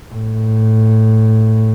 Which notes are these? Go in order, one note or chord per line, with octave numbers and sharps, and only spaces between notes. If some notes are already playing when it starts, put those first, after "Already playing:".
A2